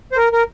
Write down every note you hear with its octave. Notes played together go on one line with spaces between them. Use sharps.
C5
A#4
A#4